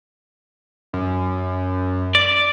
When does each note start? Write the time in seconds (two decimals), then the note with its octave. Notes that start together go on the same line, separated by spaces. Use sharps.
0.93 F#2
2.15 D5